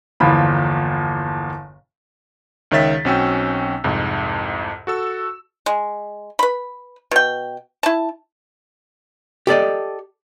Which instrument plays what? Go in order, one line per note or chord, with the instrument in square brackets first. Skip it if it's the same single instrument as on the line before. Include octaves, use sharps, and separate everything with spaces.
[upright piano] G1 E2 A#2 F3 B5
[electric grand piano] C#2 D#3 C#5 E5 A6 B6
B1 C4 C#4 F#4 G5 E6
C2 F2 G#2
F#4 A4 E6
[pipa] G#3
B4 B5
B2 G5
E4 A5
[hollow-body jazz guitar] G4 A4 D5 D#5